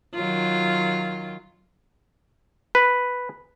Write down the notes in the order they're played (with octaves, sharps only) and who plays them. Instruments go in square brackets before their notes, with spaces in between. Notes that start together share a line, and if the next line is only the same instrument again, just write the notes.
[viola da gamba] D#3 F#3 F4
[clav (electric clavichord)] B4